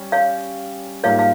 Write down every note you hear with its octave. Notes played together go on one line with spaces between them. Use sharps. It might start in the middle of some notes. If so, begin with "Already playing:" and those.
Already playing: G3 C#4
C#5 F5
G#2 G3 A#3 F4 A#4 C#5 F5
F5